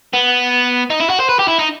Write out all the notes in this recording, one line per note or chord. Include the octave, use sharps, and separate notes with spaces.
B3
D#4
E4
F#4
C5
B4
G4
E4
D#4